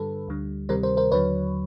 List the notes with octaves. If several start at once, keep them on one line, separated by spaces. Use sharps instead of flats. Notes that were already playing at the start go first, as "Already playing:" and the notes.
Already playing: G2 D3 G3 A4 B4
D2 D3 G3
D2 C3 D#3 G3 A#4 C5
A#4 C5
A#4 C5
D#2 D3 F#3 B4 C#5